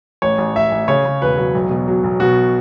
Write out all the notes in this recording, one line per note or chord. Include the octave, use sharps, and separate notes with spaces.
A1 C#5
A1
A1 E5
A1
C#3 C#5
C#3
E1 B4
F#3
B1
B2
F#3
B1
B2 F#4